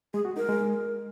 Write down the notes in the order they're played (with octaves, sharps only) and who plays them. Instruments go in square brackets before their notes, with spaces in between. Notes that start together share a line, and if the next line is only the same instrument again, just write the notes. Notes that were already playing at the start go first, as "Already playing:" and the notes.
[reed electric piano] G#3 [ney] G#4
[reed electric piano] F#4
[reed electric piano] D#4 [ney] A#4
[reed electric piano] G#3